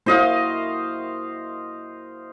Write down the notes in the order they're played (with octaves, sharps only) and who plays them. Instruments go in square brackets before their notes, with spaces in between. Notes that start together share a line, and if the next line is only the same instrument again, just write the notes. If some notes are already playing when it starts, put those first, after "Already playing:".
[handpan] A#3 E4 F#4 [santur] C5 D#5 F5